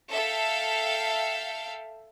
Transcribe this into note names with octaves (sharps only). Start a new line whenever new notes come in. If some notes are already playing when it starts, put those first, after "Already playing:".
A4 E5 F5 G5